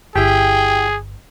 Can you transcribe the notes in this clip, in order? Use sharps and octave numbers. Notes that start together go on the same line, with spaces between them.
G1 E4 G4 G#4 G5